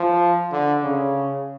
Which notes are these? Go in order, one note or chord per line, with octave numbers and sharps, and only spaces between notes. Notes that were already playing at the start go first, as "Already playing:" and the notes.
Already playing: F3
D3
C#3